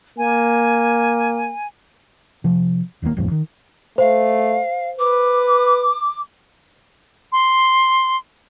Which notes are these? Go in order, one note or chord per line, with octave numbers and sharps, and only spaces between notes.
A#3 G#5
C3 F3
E1 D#2 A#2 A#3
D#1 A1 F2 G#2
D#3
A3 C5 F5
B4 D6
C6